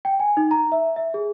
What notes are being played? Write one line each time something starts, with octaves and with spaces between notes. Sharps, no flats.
G5
G#5
D#4
A#5
E5
E5
G#4